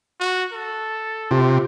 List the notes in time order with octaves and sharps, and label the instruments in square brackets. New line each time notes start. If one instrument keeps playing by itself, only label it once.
[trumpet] F#4
A4
[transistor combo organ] C3 [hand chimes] F4 G4